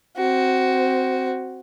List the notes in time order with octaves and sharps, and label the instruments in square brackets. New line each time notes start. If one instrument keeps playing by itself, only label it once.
[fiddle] C4 F#4